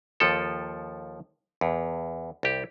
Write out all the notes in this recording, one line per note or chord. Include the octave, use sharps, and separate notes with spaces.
D#2 F3 A4
E2
C2 G4